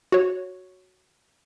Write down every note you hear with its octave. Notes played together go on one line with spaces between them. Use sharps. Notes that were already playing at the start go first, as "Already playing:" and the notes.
F#4 C#5